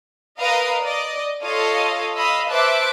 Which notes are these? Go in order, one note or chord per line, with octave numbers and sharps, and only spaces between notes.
A#4 B4 D#5 F5 A#5 D#6
D5 D#5
F4 A4 C#5 D#5 F5
D#5 F5 B5 E6
B4 C5 E5 A5 D6 F#6